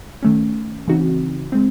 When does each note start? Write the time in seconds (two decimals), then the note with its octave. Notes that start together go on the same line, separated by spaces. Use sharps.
0.23 D#3 A3 C#4
0.88 C#3 E3 C4 D#4 F#4
1.52 G#3 C4